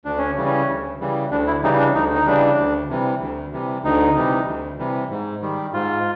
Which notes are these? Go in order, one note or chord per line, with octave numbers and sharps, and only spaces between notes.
D2 D4
C#4
C#3 E3 G3
C#4
D2
C#3 E3 G3
D2 D4
E4
C#3 E3 G3 D#4
D4
D2 D#4
D#4
C#3 E3 G3 D4
D2
C3 E3 G3
D2
C3 E3 G3
D2 D#4
C3 E3 G3
D2
C3 E3 G3
G#2
D#3 G3
G#2 F4